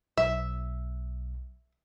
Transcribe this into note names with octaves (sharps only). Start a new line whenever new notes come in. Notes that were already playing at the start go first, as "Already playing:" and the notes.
B1 E5